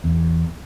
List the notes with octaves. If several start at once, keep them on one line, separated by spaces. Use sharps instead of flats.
E2